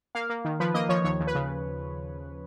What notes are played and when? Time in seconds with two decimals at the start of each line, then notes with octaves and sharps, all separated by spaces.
0.15 A#3 F5
0.30 A#3
0.45 D#3
0.60 F3 B4
0.74 A#3 D#5
0.89 F3 C#5
1.04 D#2 C#5
1.20 D#2
1.27 B4
1.35 C#3